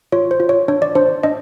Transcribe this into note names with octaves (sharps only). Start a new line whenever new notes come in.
F4 C#5
C5
F4
C#5
D4 C#5
D5
D4 C5
D4 D#5